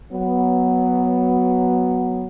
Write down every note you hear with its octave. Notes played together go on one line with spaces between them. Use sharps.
F#3 B3